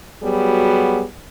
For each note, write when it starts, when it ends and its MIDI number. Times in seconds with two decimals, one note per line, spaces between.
0.23 1.03 54
0.23 1.03 55
0.23 1.03 59
0.23 1.03 66
0.23 1.03 68